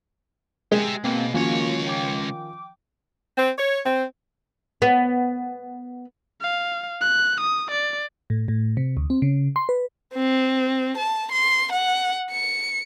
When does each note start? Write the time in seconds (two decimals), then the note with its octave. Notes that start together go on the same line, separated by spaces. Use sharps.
0.72 G#3 G4 E5
1.04 B2 A#3 C4
1.34 C#2 D#3 F3 A#3 C#4 F#4 C#5
1.86 G5 D6
3.36 C4
3.58 C#5
3.86 C4
4.82 B3
6.41 F5
7.01 F#6
7.40 D#6
7.71 D5
8.30 A2
8.48 A2
8.77 C3
8.97 D2
9.10 C4
9.22 C#3
9.56 C6
9.69 B4
10.14 C4
10.97 A5
11.32 C6
11.72 F#5
12.31 C#7